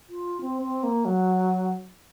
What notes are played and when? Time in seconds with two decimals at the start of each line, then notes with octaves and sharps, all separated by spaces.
0.09 F4
0.41 C4
0.62 C4
0.83 A#3
1.05 F#3